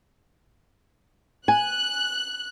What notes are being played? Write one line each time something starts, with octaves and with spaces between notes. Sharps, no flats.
G#5 F#6